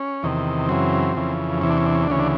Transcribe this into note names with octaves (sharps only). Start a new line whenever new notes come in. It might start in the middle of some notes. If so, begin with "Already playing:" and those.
Already playing: C#4
E2 C3 D#3
F#2 C#3 E3 C4
F2 C#3 E3
E2 C3 E3 C#4
D4
C#4
D4
C#4
D4
D2 C#3 E3 C#4
D4